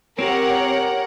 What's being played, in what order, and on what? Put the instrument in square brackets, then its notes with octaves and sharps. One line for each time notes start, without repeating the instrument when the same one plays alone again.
[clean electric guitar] C4 [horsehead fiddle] G4 C#5 [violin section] A#4 F#5